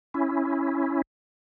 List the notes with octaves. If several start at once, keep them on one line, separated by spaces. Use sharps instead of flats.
C#4 E4